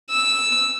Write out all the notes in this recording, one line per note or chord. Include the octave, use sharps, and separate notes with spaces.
E6